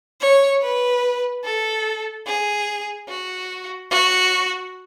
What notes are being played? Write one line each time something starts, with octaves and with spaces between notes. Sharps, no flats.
C#5
B4
A4
G#4
F#4
F#4